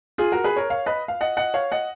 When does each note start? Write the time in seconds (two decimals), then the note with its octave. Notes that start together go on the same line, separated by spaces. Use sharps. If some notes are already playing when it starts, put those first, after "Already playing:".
0.18 F4 G#4
0.32 F#4 A#4
0.44 G#4 B4
0.56 A#4 C#5
0.70 C#5 F5
0.86 B4 D#5
1.08 F5
1.21 D#5 F#5
1.37 D#5 F#5
1.54 C#5 F5
1.72 D#5 F#5